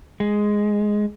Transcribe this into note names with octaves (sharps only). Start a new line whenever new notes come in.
G#3